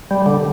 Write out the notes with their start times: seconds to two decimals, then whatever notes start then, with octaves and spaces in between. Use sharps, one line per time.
0.11 G3
0.26 D3